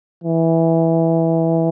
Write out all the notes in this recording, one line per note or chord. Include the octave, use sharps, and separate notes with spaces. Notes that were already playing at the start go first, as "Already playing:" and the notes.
E3